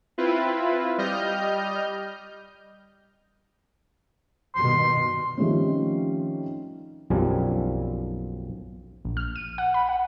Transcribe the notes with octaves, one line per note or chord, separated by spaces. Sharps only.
C4 E4 F4 B4
G3 D#5 F6 G6
G2 B2 D#3 C6
D#3 F3 G3 A3 C4 C#4
B1 F#2 F3 G3 C4 G#5
A#1
F6
D#7
F#5
B5
F#5